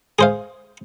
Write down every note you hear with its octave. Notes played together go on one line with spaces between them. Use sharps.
G#4 C5 F5